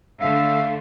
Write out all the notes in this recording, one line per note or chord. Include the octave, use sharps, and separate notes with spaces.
D3 A3 E5 F5